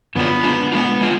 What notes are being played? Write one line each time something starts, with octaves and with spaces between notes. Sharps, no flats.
F#2 D3 F#3 B3 D4 F4
G#3 D4 F4
G#3 B3 D4 F4
G#3 D4 F4